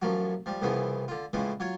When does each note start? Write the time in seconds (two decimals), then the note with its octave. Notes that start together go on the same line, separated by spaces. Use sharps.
0.02 A1 F#2 F3 F#3 F#4
0.46 F3 G3
0.62 C2 G2 C#3 E3 F3 B3
1.08 D3 F4
1.33 A2 C#3 E3 F3 G#3
1.60 F#3 F4 C#5